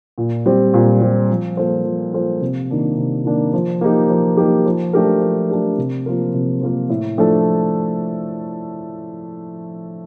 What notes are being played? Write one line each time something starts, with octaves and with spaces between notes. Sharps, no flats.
A#2
G3 C4
A#2
G3 C4
F3
A#3 F4 A4 C5
F3
A#3 F4 A4 C5
C3
D#3 A#3 D4
C3
D#3 A#3 D4
F3
A#3 D#4 G4
F3
A#3 D#4 G4
F3
A3 D4 G4 A#4
F3
A3 D4 G4 A#4
C3
F3 A#3 F4 A#4
C3
F3 A#3 F4 A#4
A2
F3 A3 D4 A4